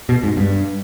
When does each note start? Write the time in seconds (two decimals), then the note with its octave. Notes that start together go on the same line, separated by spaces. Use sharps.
0.09 B2
0.24 G#2
0.37 G2